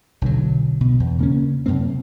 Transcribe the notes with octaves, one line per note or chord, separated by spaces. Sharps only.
B1 D3 E3 F#3
B2
E2
C#3 A#3 C#4
F#2 C3 A#3 C4